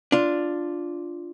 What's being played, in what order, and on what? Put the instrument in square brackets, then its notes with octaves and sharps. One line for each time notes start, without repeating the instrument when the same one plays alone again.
[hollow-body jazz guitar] D4 F4